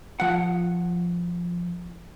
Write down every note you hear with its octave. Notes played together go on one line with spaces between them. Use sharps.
F3 F#5